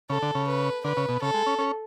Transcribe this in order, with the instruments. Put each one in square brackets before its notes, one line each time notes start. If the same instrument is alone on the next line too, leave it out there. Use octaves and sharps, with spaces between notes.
[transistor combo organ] C#3 [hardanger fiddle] A4
[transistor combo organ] D3
C#3
[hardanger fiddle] B4
[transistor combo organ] D3 [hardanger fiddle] B4
[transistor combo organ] C#3
B2
[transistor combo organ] C#3 [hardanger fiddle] A4
[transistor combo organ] G#3
C#4
C#4